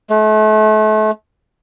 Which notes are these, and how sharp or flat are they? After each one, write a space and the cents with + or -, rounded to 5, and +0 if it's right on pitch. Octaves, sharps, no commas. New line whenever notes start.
A3 -35